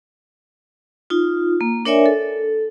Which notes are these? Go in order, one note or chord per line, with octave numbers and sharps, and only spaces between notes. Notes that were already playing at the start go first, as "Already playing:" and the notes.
D#4 F4
A#3
D4 A#4 C#5 D5 E5 G#5
A4